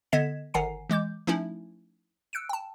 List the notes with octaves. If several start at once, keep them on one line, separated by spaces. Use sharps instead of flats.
D3 B3 D#5 G#6 B6 E7
G1 D#3 F#5 G#5 A#5 C7
E3 G#3 D6 G6
F3 A3 C#4 D#4 E4
E6 F#6 C#7 D7
G5 A5